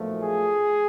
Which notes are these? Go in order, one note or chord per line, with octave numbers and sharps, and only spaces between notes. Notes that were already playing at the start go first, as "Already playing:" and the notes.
Already playing: B1 A#2 F3 A3
G#4